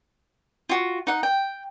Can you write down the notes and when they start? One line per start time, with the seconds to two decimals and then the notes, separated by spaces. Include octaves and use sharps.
0.69 F4 F#4
1.07 D#4 F#5
1.23 G5